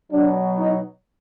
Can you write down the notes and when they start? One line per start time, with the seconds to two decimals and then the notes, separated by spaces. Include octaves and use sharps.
0.11 B2 F#3 D4
0.57 D#4